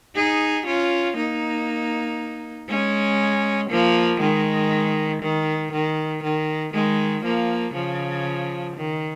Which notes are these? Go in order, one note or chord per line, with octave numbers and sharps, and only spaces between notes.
D#4 G#4
C#4 F4
A#3 D#4
G#3 C#4
F3 A#3
D#3 G#3
D#3
D#3
D#3
D#3 G#3
F3 A#3
C#3 F3
D#3